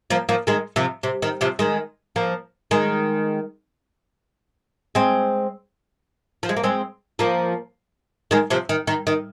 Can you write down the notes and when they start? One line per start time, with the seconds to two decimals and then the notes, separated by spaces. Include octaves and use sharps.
0.10 F3 A#3
0.29 F3 A#3
0.47 D#3 G#3
0.76 C3 F3
1.03 C3
1.22 D#3
1.41 C3 F3
1.59 D#3 G#3
2.16 F3 A#3
2.71 D#3 G#3
4.95 G#3 C4
6.43 F3
6.49 G#3
6.57 A#3
6.63 G#3 C4
7.19 F3 A#3
8.31 D#3 G#3
8.50 C3 F3
8.69 D#3
8.87 D#3
9.07 D#3